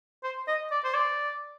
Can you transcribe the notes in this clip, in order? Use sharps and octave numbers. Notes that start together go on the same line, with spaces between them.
C5
D#5
D5
C5
D5